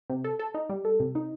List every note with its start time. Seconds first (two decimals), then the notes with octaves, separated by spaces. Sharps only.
0.09 C3
0.24 A4
0.39 A4
0.54 D#4
0.70 G3
0.85 A4
1.00 C3
1.15 D#4